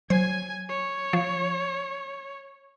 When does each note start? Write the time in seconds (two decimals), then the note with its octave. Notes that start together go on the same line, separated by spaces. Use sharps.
0.10 F#3 C5 G#5 G#6
0.69 C#5
1.13 F3